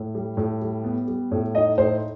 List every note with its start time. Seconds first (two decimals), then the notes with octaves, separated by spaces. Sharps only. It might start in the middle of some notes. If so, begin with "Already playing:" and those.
Already playing: A2
0.15 G3
0.37 A2
0.61 G3
0.84 B3
1.07 G3
1.31 A2
1.55 D#4 D#5
1.78 A2 C5